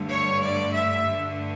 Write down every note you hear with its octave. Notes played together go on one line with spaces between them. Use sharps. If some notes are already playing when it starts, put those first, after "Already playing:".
Already playing: G2 D3 A3
C#5
D5
E5
G2 D3 A3